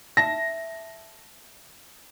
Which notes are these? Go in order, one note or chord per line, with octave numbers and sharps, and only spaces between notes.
E5 A5 A#6